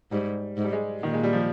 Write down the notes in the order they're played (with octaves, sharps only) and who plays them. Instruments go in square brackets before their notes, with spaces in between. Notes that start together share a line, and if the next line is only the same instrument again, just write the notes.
[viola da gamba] G#2 [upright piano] G3
[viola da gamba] G#2
[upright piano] G3
G#3
[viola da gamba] A#2 [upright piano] D#3
[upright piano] G#3
G3
F3